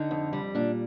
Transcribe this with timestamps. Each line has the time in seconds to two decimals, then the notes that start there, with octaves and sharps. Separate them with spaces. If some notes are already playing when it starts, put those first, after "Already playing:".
Already playing: D3 D#4
0.11 F2
0.33 G3
0.55 A#2 D4